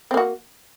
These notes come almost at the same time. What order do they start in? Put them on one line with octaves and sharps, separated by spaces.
C4 A#3 F#4